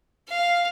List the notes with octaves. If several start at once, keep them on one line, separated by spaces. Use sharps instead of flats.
F5